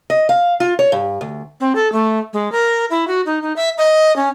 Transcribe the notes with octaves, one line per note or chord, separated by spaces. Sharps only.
D#5
F5
F4
C#5
G2
D2
C4
A4
A3
G#3
A#4
E4
F#4
D#4
D#4
E5
D#5
C#4